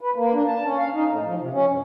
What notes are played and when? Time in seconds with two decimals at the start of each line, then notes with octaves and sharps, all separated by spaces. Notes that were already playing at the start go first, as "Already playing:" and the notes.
0.01 B4
0.16 A#3
0.34 D4
0.47 A5
0.64 C#4
0.78 F5
0.94 D#4
1.08 A2
1.24 F3
1.40 C3
1.54 C#4
1.69 G2